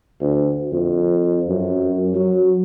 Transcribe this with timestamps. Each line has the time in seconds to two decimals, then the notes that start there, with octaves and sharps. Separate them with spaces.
0.21 D2
0.72 F2
1.49 F#2
2.15 F#3